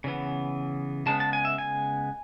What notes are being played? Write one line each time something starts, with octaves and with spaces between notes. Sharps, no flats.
C#3 E3 B3
C#3 G#3 B3 A5
A5
G#5
E5
G#5